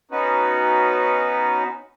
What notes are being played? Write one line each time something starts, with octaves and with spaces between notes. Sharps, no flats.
B3 C#4 D#4 F#4 B4